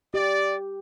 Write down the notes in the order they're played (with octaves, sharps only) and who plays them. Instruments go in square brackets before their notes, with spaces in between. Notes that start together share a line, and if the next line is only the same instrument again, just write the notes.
[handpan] G4 [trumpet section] D5